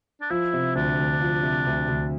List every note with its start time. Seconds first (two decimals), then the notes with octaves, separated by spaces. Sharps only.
0.21 D4
0.30 F3 E4
0.54 C3
0.75 D2 D4
0.98 D2
1.21 F3
1.43 C3
1.67 D2
1.88 D2